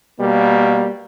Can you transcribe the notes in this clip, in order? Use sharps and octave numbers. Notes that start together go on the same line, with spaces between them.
B2 G3 A#3